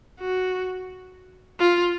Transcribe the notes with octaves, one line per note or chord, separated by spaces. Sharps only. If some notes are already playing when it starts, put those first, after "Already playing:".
F#4
F4